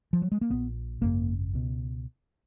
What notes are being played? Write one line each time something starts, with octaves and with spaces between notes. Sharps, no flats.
F3
F#3
G#3
A#3
A#1 A#2 B3
G#1 F#2 C#3 A#3
C#2 B2